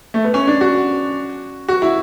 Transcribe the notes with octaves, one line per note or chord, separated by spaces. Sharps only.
A3
B3
C#4
D4
F#4
F#4
E4